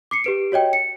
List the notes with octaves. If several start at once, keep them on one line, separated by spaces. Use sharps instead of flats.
D6 C7 C#7
G4 B4 D7
F#4 C#5 D#5 G5
C#7